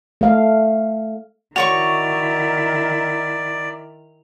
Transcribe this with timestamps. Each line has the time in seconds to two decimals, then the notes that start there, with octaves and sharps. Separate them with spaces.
0.21 A3 F5
1.56 D#3 E4 F#4 C#5 D5 C#6 F7